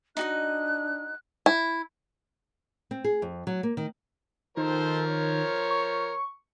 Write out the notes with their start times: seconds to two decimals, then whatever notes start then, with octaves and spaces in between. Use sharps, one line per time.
0.17 D4 D#4 F#4 D#5 F#6
1.46 E4
2.91 C4
3.04 G#4
3.22 F2
3.47 F#3
3.63 A#3
3.77 D#3
4.57 D#3 F3 A4 A#4 C5
5.06 C#5
5.70 C#6